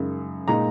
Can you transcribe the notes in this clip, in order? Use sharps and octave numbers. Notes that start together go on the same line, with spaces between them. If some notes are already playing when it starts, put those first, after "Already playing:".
Already playing: F#2 C#3 G#3 D#4
A#2 G#3 D#4 A#5